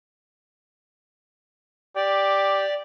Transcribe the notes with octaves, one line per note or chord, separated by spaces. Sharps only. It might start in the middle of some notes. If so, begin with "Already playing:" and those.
G4 D5